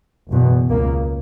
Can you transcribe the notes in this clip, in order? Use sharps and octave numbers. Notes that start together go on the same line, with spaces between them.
F#1 E2 B2
C#2 C#3 A#3